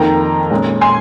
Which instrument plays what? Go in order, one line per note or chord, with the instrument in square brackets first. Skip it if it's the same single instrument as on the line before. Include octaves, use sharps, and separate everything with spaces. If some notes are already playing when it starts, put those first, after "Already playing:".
Already playing: [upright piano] F2 D#3 A#3 G5 A#5
A#2 G#3 C#4
G#5 C6